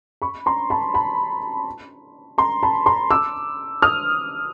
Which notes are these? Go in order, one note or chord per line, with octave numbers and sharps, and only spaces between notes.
B5 C#6
A#5 C6
A5 B5
A5 B5
A#5 C6
A5 B5
A#5 C6
D6 E6
D#6 F6